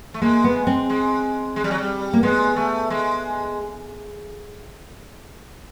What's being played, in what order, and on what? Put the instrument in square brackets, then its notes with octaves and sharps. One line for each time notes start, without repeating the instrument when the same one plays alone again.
[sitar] A3
[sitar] G#3 [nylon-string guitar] A#3
[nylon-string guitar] B3
C4
[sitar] G#3
G#3
G3
F#3
G3
[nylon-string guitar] A#3
[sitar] G#3 [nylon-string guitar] B3
[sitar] A3
G#3